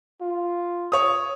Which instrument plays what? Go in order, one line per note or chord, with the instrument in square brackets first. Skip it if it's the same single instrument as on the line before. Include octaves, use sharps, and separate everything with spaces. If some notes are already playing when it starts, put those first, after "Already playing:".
[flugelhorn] F4
[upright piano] C#5 D#6